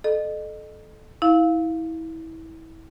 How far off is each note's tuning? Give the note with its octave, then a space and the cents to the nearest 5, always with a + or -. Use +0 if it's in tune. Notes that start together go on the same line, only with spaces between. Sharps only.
A4 -20 D#5 -35
E4 -25 F5 +0